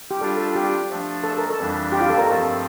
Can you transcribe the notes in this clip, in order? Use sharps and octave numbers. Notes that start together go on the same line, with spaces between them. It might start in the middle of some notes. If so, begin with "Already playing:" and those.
G4
G3 D4 F4 A4
A4
G4
F3 A3 D4
A4
A#4
A4
F2 E3 G3 D4
G4
F4
A4
A#4
G2 F3 A3 C4 A4